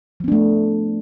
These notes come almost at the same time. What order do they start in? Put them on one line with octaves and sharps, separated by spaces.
F3 B3 D4 A3